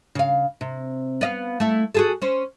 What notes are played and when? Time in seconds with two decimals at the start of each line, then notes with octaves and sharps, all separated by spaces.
0.15 C#3 F5
0.61 C3
1.21 B3 D#5 F5
1.60 A3 E4
1.95 F#4 G#4 A4
2.22 C#4 C5